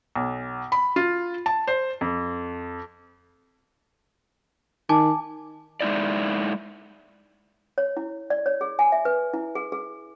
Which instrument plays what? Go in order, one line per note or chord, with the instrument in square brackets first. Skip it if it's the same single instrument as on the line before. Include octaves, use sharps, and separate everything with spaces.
[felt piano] B1
B5
F4
A5
C5
F2
[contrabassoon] D#3 [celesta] G#5 A5 D6
[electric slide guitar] G#3 D#4 E4 D5
[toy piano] C#5
E4
D5
C#5
G#4
G#5
E5
B4
E4
G#4
G#4